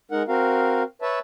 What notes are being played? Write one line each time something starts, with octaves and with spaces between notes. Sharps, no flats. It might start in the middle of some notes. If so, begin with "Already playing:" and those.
G#3 D#4 A#4 F#5
C4 F#4 A#4 F5
B4 C#5 E5 A5